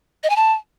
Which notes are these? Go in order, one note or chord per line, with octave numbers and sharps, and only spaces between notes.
D#5
G#5
A5